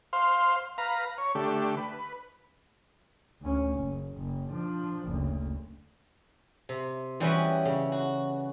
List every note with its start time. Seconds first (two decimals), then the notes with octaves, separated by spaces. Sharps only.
0.13 C5 F5 C6
0.78 B4 F5 A#5
1.18 C#5
1.35 D3 A3 G4
1.77 B4
3.42 D2 C#4
3.79 F#1
4.17 F#1
4.51 F3 D4
5.08 F#1 D2
6.69 C3
7.20 E3 G3 B3 C#4 F#4
7.65 C#3
7.92 F#4